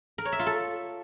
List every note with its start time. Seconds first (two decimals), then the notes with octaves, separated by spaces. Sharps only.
0.18 A#4
0.25 C#5
0.32 E5
0.39 F4
0.46 A4